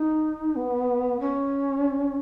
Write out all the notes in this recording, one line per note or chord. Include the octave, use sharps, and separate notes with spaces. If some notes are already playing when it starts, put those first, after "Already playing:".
Already playing: D#4
B3
C#4